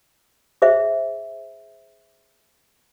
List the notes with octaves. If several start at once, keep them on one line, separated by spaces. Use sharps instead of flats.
G#4 C5 E5